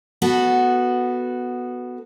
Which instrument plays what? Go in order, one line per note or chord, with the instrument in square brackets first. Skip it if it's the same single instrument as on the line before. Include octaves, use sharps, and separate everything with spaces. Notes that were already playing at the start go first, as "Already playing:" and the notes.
[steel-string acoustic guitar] B3 F#4 A4